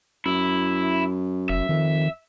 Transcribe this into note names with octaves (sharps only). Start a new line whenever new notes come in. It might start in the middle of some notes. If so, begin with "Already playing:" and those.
F#2 E4
F1 E5
F2 D#3